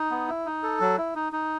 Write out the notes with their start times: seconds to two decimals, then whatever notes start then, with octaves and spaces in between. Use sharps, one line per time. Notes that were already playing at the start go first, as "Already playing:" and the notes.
Already playing: D#4
0.11 B3
0.28 E4
0.46 D#4
0.63 A4
0.80 F#3
0.98 E4
1.15 D#4
1.33 D#4